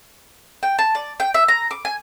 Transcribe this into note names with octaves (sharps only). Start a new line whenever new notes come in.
G5
A5
D5
G5
E5
A#5
D6
G#5